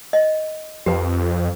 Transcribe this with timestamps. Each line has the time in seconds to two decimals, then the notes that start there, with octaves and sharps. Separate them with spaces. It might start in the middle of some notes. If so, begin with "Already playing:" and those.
0.13 D#5
0.86 F2 G4 B4